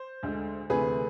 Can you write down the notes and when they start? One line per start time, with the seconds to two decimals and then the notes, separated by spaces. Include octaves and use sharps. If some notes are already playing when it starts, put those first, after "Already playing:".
Already playing: C5
0.23 D2 D3 G#3
0.70 D2 C3 E3 A3 G#4 B4